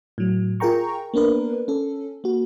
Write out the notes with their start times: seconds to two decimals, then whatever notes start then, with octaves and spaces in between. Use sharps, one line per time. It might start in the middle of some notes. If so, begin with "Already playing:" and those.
0.18 A2 F#3
0.60 F4 G#4 A#4 G5 A#5 C#6
1.14 A#3 B3 D4 A#4 B4
1.68 C#4 A4
2.24 A#3 F#4